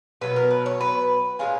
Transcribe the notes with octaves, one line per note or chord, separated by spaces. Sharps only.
B2 F#3 B3 B4
A#4
B4
C#5
B4
A#2 G#3 C#4 F4